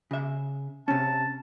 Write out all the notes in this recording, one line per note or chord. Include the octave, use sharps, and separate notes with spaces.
C#3 E5
C3 C#4 A5